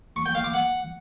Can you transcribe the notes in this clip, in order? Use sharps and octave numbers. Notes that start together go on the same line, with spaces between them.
C#6
G5
F5
D6
F#5